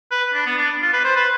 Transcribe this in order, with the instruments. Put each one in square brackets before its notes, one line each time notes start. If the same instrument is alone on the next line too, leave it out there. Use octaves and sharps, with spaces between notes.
[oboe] B4
D4
B3
D4
F4
B4
C5
B4